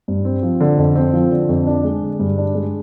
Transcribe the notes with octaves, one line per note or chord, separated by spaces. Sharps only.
G2
C4
F3
D3
F2
C4
F3
D3
F2
D4
G#3
D3
G2
D4
G#3